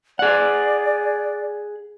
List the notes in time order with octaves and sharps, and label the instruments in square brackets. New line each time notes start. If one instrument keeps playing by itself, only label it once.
[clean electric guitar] G#4 F#5 [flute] D5